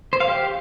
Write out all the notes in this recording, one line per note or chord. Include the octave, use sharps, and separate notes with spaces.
C5
F5
G4